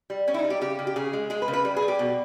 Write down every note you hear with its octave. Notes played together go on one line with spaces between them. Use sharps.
G3
G3 C#4
E4
D#4
G3
G4
C#3 G4
C#3
G4
C#3 G#4
G#3
G#3 G#4
B4
C#3
B4
G3
G#4
G3
G4
B2